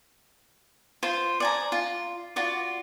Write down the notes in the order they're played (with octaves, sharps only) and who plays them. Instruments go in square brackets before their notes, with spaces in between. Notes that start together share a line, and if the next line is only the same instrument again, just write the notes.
[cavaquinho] F4 C5
D5 G#5 A#5
F4
F4 F#4 D5